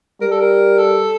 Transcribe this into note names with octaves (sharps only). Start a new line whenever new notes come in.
G3 A#4
A4
A#4
A4